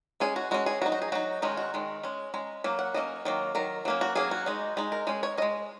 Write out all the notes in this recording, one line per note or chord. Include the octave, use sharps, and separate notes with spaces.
G#3 C#4 G#4
F#4
G#3 C#4 F#4
G#4
F#3 D#4 F#4
F#4
G#4
F#3 D#4 F#4
D#3 G#3 C#4 D#4
F#4
D#3 G#3
G#3 C#4
G#3 C#4 A#5
F#3 A#3
F#5
F#3 A#3 C#4 D#5
D#3 F#3 A#3
D#3 F#3 A#4
F#3 A#3 C#4
F#4
F#3 A#3 C#4 G#4
F#4
G#3 D#4
G#3 D#4
A#4
G#3 C#4 G#4
C#5
G#3 C#4 D#5